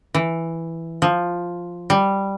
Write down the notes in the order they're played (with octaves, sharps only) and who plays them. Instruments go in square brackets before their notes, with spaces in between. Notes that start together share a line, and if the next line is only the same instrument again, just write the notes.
[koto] E3
F3
G3